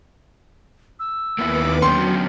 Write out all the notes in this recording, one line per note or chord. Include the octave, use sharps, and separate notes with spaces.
E6
D#2 A#3 B3 E4 B4 D6
D3 F#3 B3 C#4 G5 C6